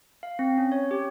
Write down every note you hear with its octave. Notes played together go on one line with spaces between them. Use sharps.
F5
C4
C#4
C#5
G4